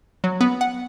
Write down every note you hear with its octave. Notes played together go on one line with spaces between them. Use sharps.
F#3
B3
F#5